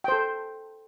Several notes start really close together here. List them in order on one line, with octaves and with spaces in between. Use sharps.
G5 C5 A4